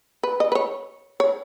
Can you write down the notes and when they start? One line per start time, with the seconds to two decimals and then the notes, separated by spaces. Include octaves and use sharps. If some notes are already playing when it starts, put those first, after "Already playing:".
0.23 B4
0.40 D#5
0.52 B4
0.55 C#5
1.20 C#5